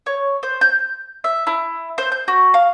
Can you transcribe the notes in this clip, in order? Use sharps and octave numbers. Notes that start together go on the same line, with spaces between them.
C#5
C5
G6
E5
E4
C5
G6
F#4
F5